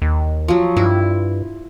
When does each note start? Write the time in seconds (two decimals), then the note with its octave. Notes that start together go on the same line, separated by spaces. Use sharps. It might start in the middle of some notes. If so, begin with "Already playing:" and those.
0.02 D#2
0.48 F3 F#3
0.77 G2 E4